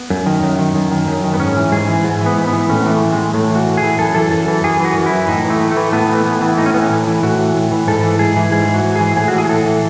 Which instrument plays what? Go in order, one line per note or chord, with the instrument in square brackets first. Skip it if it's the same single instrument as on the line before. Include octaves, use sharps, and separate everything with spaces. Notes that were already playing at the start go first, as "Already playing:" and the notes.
Already playing: [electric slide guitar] B3
F#2
D#3
F#2
D#3
F#2
D#3
F#2
D#3
B3
G#2 C#4
E3
G#2 G#4
E3
G#2
E3
B3
G#2
B3
E3
A2 C#4
B3
E3 A3
A2
G#3
E3
A2 A3
E3 F#4
A2
G#4
E3
F#2 A4
E3 A4
F#2 A4
E3
F#2 G#4
E3 F#4
F#2
E4
E3
A2 D#4
E3
A3
A2
A3
E3
A2 B3
E3
A3
A2 B3
E3
A2 D#4
C#4
E3 B3
C#4
A2
E3
A2 F#4
E3
A2
E3
G#2 A4
E3
G#2 G#4
E3
G#2 G#4
E3
F#4
G#2
E3 G#4
A2 G#4
F#4
E3 G#4
G#4
A2 A4
E3